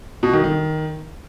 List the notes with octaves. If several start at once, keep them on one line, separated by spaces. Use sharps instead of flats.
B2
D#3
D#3